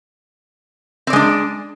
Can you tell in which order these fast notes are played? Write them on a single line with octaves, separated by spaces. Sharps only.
C4 D5 G#3 D4